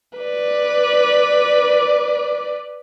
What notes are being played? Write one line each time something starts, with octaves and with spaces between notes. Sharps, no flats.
B4 D5